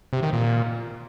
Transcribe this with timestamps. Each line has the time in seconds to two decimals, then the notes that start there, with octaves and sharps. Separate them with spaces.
0.13 C3
0.23 D#3
0.33 A#2